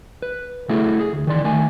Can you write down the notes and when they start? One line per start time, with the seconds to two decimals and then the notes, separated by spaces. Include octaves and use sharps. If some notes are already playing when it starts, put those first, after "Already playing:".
0.22 B4
0.69 A3 E4 F#4 G#4 A4
0.99 G#4
1.13 D2
1.27 D#3 E3 D5 C6
1.44 D#3 A3 G#5